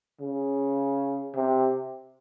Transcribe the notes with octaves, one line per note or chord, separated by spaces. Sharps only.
C#3
C3